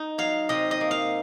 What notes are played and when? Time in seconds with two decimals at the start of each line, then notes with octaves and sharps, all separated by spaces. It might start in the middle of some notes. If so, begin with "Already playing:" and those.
Already playing: D#4
0.18 F#3 F5
0.49 C3 D#5
0.71 D#5
0.81 A#3
0.91 F5